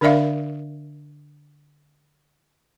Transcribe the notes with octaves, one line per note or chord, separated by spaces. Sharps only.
D3 D4 A#4 D5 E5 F5